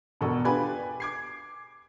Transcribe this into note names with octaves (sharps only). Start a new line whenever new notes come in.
E1 B2 A4 C#6
D4 F4 G4 B4 G#5 B5
D6 G#6 C7